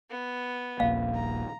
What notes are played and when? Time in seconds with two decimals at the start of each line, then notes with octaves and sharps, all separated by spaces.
0.10 B3
0.80 D#1 A#1 A#3 F5
1.15 A#5